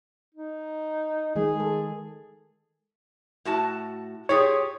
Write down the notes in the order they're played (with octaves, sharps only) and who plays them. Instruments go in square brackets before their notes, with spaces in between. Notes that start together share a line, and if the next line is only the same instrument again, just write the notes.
[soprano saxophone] D#4
[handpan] D#3 G#3 [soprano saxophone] G#4
[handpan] A4
[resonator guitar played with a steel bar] A2 F#4 A5
[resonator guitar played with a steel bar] F4 G4 G#4 [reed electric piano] C#5